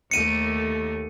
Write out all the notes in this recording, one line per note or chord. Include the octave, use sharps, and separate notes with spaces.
D#2 A3 C#7 D#7